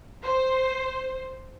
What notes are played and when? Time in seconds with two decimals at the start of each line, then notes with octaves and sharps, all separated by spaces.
0.23 C5